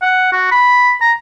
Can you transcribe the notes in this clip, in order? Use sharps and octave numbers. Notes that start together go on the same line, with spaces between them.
F#5
F#4
B5
A#5